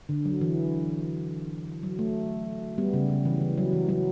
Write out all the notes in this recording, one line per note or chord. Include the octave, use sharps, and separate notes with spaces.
D3
F#3
E3
F#3
A3
G3 B3
C#3
C#3
E3
E3
F#3
E3
F#3